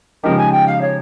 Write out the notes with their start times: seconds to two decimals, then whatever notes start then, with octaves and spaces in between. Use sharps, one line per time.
0.23 C#3 F3 G#3 D#4 G4 A#4
0.38 G#5
0.52 G5
0.67 F5
0.81 C#5